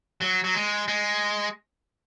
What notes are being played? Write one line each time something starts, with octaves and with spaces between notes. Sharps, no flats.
F#3
F#3
G#3
G#3